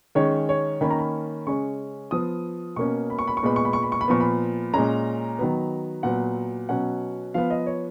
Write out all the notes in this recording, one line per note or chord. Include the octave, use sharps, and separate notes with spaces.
D#3 G#3 C#4 C#5
C#5
D#3 A#3 C#4 B5
A#5
B5
C#3 G#3 C#4 C#6
F3 B3 D#6
B2 A#3 C#4 C#6
B5
C#6
B5
C#6
A#2 G#3 B3 B5
C#6
B5
C#6
B5
C#6
B5
A#2 F3 B3 C#6
B5
A#2 G#3 C#4 A#5
D#3 F#3 B3
A#2 F#3 B3 F#5
B2 F#3 C#4 F#5
F3 B3 F5
D#5
C#5